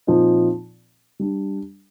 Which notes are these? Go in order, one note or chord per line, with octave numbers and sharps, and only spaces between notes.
A#2 F3 C4 D#4
G3 D4